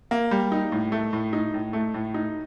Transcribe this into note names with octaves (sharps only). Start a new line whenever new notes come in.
A#3
G3
D#4
A2
A3
A2
D#4
A2
A3
A2
D#4